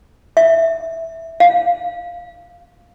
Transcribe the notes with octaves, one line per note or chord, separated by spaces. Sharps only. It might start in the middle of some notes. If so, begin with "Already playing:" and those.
E5
F5